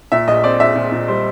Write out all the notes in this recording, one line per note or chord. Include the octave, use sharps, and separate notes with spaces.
A#2 E5
A#1 D#5
C4 D5
A#1 E5
A#2
A#2
G3 C5